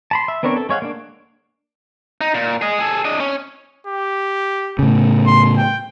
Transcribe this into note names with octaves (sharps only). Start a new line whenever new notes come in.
A5 B5 C6
E5
B3 C4 D4 A#4 C#5
A4
G#3 C#5 F5 F#5
A#3 D4
D#4
A#2
G#4 D#5
G#4 A4
D4 D#5
C#4
G4
A2 C#3
C6
G5